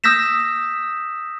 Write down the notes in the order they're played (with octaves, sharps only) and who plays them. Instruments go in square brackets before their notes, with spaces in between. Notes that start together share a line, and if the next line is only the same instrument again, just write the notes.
[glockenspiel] D#6 E6 G6 A#6 B6 E7